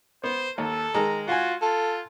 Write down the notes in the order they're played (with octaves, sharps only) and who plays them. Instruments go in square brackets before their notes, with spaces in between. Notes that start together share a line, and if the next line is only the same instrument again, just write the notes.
[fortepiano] B3 [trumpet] C5
[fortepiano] D#2 [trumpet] A4
[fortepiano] D#3 G#3 [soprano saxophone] A#5
[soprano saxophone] F4 [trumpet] F#4 [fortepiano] F#5 G#5
[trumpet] F4 [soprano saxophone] A4